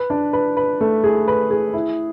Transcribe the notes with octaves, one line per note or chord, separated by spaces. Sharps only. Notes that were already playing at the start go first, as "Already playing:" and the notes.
Already playing: B4
D4
B4
B4
A3
G#4
B4
G#4
E4